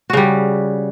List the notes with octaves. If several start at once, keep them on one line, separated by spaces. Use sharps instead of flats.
C#3 G3 F#4